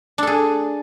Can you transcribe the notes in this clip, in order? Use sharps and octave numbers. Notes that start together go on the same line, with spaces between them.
D4 G#4 A4